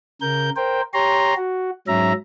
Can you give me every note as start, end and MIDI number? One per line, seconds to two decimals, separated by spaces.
0.21 0.50 49
0.21 0.50 70
0.21 0.50 91
0.56 0.81 70
0.56 0.81 72
0.56 0.81 79
0.94 1.34 67
0.94 1.34 73
0.94 1.34 82
0.94 1.34 84
1.37 1.71 66
1.88 2.13 44
1.88 2.13 54
1.88 2.13 61
1.88 2.13 76
1.88 2.13 82